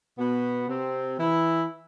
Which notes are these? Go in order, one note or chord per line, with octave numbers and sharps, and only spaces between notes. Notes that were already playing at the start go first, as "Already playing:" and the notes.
B2 B3
C3 C4
E3 E4